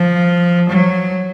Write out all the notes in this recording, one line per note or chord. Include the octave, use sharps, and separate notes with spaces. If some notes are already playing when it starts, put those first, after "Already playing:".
Already playing: F3
F#3